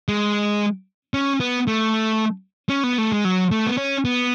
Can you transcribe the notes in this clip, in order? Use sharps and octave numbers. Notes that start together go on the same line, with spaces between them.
G#3
C#4
B3
A3
C#4
B3
A3
G#3
F#3
A3
B3
C#4
B3